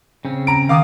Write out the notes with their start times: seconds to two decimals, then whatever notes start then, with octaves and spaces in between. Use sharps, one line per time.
0.25 C#3 C4 C#4
0.47 A#5 D7
0.69 D#3 F5 D6 D#6